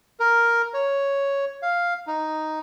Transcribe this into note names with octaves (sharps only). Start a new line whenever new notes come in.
A#4
C#5
F5
D#4